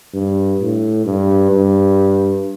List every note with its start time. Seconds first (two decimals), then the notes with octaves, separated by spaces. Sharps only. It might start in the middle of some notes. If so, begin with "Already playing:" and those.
0.13 G2
0.60 A2
1.05 G2
1.51 G2